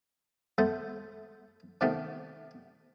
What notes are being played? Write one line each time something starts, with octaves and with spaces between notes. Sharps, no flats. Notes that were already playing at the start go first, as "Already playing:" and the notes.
A3 B3 A4 C5
C3 D#3 A3 B3 D4 G4